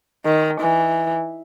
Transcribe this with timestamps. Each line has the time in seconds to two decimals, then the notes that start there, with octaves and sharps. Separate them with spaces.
0.25 D#3
0.61 E3